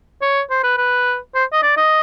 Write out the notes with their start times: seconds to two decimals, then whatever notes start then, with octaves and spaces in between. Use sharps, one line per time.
0.22 C#5
0.50 C5
0.64 B4
0.77 B4
1.35 C5
1.53 D#5
1.63 D5
1.77 D#5